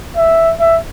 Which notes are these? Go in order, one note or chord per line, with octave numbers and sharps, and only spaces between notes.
E5
E5